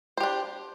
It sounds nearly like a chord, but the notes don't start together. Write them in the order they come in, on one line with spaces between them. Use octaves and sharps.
C5 G4 D4